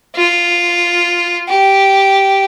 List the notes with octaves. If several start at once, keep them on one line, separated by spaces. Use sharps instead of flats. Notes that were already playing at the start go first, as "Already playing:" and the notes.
F4
G4